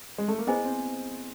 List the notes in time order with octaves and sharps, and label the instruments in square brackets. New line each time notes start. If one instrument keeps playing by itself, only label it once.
[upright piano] G#3
A3
A#3
[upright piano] B3 [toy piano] E4 G#4 C5 D#5 G#5
[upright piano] C4